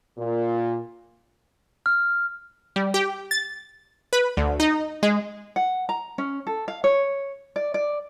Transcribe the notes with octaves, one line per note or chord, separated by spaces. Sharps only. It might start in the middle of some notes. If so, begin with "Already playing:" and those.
A#2
F6
G3
G4
A6
B4
D2
D#4
G#3
F#5
A#5
C#4
A4
F5
C#5
D5
D5